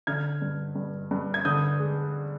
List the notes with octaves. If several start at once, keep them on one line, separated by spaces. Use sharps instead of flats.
D3 F6 G#6
G2
G2
G2
G#6
D3 D#6 G6
G#3